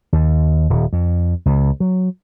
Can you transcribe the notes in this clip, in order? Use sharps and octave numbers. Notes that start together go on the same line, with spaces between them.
D#2
D#1
F2
C#2
F#3